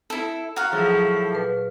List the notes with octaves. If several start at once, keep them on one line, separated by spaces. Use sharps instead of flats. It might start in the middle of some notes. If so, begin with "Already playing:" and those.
E4 A4
F#4 F5 A#5 F#6
A2 F3 F#3 G#4
A#2 B4